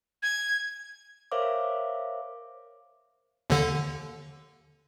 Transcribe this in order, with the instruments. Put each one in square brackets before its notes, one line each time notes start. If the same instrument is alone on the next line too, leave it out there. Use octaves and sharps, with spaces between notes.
[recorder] G#6
[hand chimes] A#4 C5 C#5 E5 F5 D6
[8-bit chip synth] D#2 D3